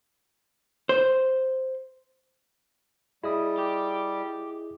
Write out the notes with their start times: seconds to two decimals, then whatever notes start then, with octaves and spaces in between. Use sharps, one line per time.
0.89 C5
3.23 G3 E4 G#4 D#5 D#6
3.58 G4